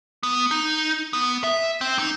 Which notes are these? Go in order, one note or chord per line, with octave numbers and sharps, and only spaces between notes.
B3
D#4
B3
E5
C4
D#4